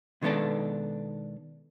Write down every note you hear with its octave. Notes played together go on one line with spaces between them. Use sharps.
B2 D#3 G#3 B3 D4 A4